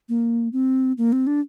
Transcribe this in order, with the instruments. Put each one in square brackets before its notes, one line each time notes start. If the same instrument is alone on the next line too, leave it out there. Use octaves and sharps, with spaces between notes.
[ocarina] A#3
C4
A#3
C4
D4